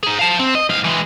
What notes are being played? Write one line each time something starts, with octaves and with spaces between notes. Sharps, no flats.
D#4 G#4
F5 A5
C4
D#5
G#2 F5
E3 G#3